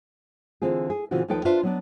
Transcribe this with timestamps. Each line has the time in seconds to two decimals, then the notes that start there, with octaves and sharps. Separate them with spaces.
0.62 D3 E3 C4 F4 G#4
0.90 G#4
1.11 A#2 C#3 E3 C4 F4 F#4
1.28 D#2 F3 D#4 A4 B4 G5
1.45 D4 F4 B4 C5 D5 E5
1.63 F#3 B3 D4